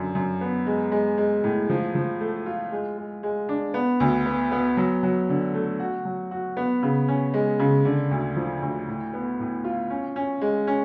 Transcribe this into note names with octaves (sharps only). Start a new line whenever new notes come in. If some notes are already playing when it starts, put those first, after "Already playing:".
Already playing: F#2 D3
F#2
B3
G#3
G#3
G#3
A2
F3
F3
A3
F4
G#3
G#3
G#3
D4
B3
D2
B3
B3
F#3
F#3
D3
A3
F#4
F#3
F#4
B3
C#3
C#4
G#3
C#3
D3
D2
F3
D2
A2
B3
A2
F4
C#4
C#4
G#3
C#4